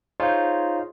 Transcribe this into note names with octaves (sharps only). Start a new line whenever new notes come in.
D#4 F4 G#4 C5 C#5